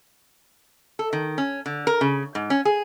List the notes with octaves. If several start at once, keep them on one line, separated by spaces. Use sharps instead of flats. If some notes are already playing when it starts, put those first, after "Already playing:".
A4
D#3
C#4
D3
A#4
C#3
G#2
C#4
G#4